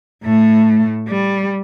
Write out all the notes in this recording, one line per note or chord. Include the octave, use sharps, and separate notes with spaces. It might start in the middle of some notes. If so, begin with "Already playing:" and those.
A2 A3
G3